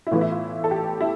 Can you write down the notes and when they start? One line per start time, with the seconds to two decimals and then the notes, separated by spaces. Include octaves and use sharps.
0.07 E4
0.11 A2 E3 B3 F4
0.21 E4
0.31 F4
0.64 A4
0.71 G4
1.01 E4